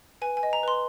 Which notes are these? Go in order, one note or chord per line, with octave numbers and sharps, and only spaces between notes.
B4 G#5
G#5
D#5
A#5
B4 C6